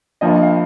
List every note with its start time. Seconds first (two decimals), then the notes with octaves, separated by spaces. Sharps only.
0.21 G2 F3 A#3 D#5
0.43 F5